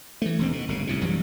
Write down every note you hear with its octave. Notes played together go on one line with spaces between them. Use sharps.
E3 A3
E1 D#2 C4
B2
G1 C#3
C2 A2 C3
A#1 F#2 E3 G3